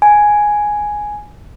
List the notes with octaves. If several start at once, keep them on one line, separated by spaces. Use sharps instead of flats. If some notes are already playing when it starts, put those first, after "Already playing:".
G#5